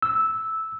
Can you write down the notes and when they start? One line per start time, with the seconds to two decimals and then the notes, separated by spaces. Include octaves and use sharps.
0.02 E6